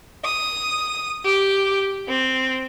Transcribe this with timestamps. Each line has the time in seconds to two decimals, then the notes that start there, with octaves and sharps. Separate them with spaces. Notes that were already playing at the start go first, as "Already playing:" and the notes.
0.24 D#6
1.25 G4
2.08 C4